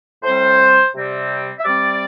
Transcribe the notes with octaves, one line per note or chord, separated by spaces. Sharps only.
A2 G3 C4 C5
C3 G3 C4
E5
C3 G3 C4 D5